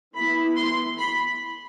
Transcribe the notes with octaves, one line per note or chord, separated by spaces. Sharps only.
E3 B3 E4 B5
C6
B5